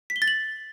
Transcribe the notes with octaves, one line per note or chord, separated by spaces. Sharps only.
B6
G7
A6
F#7